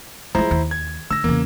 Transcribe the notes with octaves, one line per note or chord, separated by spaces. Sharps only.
F3 G#3 E4 C5 A#5
D#2
G#6
D3 E6 A#6
E2 C#3 A#3